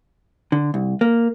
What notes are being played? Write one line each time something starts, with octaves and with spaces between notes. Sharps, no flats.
D3
C2
A#3